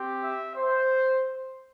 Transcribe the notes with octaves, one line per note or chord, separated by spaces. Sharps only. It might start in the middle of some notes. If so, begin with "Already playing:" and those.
Already playing: C4 G4
E5
C5